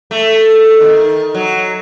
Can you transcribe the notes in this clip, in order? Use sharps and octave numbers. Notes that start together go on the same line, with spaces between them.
A3
D#3
F#3